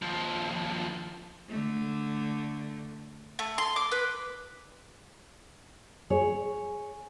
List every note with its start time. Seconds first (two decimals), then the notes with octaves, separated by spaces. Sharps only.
0.02 D#2 F3
1.49 D3 A3
3.39 A3
3.58 C6
3.76 D6
3.91 B4
6.10 G#4 C#5